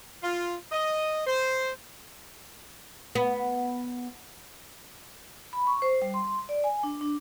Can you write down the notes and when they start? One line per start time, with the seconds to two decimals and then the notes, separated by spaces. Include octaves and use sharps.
0.23 F4
0.72 D#5
1.26 C5
3.15 B3
5.53 B5
5.67 C#6
5.82 C5
6.02 G3
6.14 C6
6.49 D5
6.64 G#5
6.83 D4
7.01 D4